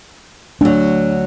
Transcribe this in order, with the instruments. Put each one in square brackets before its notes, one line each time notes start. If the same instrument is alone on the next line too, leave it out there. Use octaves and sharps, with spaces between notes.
[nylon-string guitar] D2 F#3 [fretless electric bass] D4